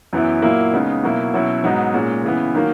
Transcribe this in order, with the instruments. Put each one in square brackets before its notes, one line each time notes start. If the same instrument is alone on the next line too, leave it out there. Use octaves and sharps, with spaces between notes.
[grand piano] F#2 E3 B3 E4
A#2 F#3 A#3 E4
C#3 G#3 B3 D#4
B2 F#3 A#3 E4
B2 F#3 C#4 E4
G#2 F#3 B3 D#4
A#2 G#3 C#4
C#3 E3 B3
D#3 F#3 A#3